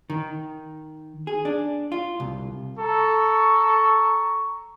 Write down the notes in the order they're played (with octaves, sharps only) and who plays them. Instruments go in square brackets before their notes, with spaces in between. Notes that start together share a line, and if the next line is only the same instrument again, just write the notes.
[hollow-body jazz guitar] D#3
G#4
D4
F4
C2
[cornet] A4 [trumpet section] A#5 C#6